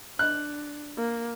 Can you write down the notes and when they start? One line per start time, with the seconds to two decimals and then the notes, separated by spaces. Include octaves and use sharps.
0.19 D4 F#6
0.97 A#3